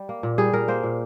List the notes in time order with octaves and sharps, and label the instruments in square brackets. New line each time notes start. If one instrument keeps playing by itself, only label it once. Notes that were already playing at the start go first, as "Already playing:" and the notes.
Already playing: [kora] G3
A#3
A#2
G3 G#4
A#2 A#4
A#3 C5
A#2